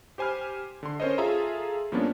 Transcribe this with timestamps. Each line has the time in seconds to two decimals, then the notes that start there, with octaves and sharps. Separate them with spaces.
0.18 G4 C5 G#5 B5 F6
0.83 D3 C6
1.00 C#4 A#4 C5 C#5 D#5
1.18 F4 G#4 A4 E5 A#5 C6
1.92 G2 F3 A#3 B3 C#4 D4